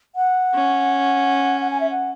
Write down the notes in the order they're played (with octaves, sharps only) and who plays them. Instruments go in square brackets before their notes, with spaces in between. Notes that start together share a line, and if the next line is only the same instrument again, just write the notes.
[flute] F#5
[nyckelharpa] C#4
[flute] F#5
G#5
E5
F#5